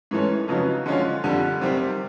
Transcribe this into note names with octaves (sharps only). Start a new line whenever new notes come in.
G#2 E3 A3 C#4
F2 C#3 F#3 B3 D#4
D3 F3 G#3 C#4 F4
F2 D3 G3
C3 D#3 G3 C4